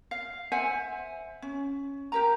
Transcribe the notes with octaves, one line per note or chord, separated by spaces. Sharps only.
F5
C5 E5 F#5 G#5
C#4
G4 A#4 A#5